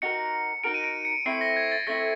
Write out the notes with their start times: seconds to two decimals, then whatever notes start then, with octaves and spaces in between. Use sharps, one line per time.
0.02 D#4 F#4 A#4 C#7
0.64 D#4 F#4 A#4 D7
0.74 D#7
0.84 D7
1.05 C#7
1.26 A3 C4 E4 C7
1.41 A#6
1.56 G#6
1.72 A6
1.87 A3 C4 E4 A#6